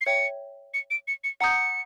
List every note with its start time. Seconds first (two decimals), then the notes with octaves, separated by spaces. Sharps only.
0.01 C7
0.06 C#5 E5 G5 C#7
0.74 C#7
0.90 D7
1.08 C#7
1.24 C#7
1.41 F#5 A#5 D#6 G6 C#7